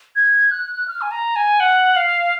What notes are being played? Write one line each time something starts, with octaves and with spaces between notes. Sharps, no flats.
G#6
F#6
F6
G#5
A#5
G#5
F#5
F5